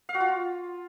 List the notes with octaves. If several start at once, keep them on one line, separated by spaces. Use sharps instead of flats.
F5
F#4
F4